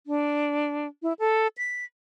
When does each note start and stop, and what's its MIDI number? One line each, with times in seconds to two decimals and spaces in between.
0.07 0.87 62
1.03 1.13 64
1.19 1.47 69
1.58 1.84 95